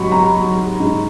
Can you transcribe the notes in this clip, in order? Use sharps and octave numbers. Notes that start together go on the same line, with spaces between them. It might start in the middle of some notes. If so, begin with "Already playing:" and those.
Already playing: G#2 F#3 B5 C#6
A#5
F#3
G#2